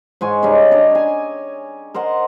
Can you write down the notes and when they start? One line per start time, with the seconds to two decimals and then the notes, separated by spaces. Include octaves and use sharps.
0.21 G#2 G#3 G#5 C#6
0.43 C#3 G3 D#4
0.71 D4 C#5 D#5
0.91 C#4 G#5
1.94 A#4 C5 D#5 F#5